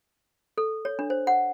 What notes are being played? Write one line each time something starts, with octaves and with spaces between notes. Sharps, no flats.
A4
C#5
D4
C5
F#5